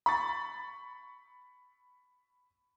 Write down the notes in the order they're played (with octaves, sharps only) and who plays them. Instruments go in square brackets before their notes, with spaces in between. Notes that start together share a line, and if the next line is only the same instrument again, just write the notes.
[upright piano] B5 C#6 A6